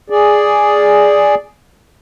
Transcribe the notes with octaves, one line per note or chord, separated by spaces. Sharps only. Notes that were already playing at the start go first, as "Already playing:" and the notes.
G#4 D5